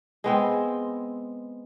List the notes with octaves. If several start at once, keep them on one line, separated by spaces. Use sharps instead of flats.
G#3 B3 C4